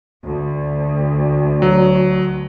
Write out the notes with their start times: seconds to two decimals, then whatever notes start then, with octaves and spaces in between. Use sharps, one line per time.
0.24 D2
1.62 F#3